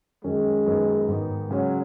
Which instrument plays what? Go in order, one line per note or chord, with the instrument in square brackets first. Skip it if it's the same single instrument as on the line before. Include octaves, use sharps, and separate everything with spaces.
[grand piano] F#2 D#3 F#3 C#4 [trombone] G#3
[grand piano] F#2 D#3 B3 D#4
G#2 D#3 B3 D#4
[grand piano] C#3 G#3 C#4 [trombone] F#3